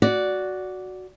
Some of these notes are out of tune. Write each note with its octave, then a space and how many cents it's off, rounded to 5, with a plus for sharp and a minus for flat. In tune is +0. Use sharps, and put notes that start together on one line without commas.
F#4 +0 D5 -10